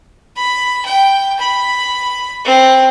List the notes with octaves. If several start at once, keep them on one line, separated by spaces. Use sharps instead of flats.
B5
G5
B5
C4